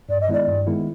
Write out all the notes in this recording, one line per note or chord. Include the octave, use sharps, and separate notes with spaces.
G2 D5
D#5
D#3 G#3 B3 E4 D5
G2
D#3 G#3 B3 E4